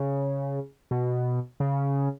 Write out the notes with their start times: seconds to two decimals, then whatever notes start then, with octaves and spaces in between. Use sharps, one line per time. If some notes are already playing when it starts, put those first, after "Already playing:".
Already playing: C#3
0.91 B2
1.60 C#3